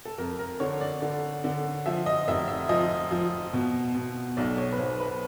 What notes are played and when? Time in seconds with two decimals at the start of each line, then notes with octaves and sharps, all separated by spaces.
0.05 A4
0.18 F2 A#4
0.39 A#4
0.60 D3 C#5
0.81 D5
1.02 D3
1.44 D3
1.86 F3 E5
2.06 D#5
2.28 F1 E5
2.48 E5
2.69 F3 D#5
3.11 F3
3.53 B2
3.95 B2
4.37 B1 D5
4.58 C#5
4.72 B4
4.78 B1 C5
5.00 B4